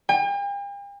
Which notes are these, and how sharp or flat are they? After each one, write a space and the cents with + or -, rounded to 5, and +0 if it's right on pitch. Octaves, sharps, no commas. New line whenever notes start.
G5 +45